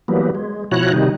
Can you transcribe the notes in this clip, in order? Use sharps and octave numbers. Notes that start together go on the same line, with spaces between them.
E3 F#3 G3 A#3 B3
G#3
B2 F3 E4 F#4 C#5 F#6
C3 D#3 G3 D#4